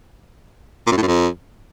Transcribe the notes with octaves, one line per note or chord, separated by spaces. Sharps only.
A#2
F#2
A2
F#2
F2